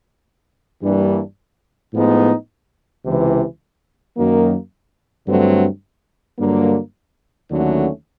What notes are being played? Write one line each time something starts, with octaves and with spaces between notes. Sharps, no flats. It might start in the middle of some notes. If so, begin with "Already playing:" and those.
G2 E3 G3 A#3 D4
A2 F3 G#3 B3 D#4
C#2 C3 E3
F#2 D#3 F#3 A#3
G2 D3 F#3 A3 C4
G2 D3 F#3 A#3
D#2 D3 F#3 A3 C#4